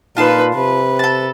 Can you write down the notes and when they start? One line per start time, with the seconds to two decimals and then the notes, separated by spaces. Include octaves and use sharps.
0.17 A#2 D#4 F4 B4 A5 C6
0.55 C3 B4
0.99 A4 A5